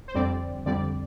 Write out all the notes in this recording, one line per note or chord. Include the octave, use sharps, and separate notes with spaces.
C5
F2 D3 G3 C4 D5
F2 D3 G3 C4 D5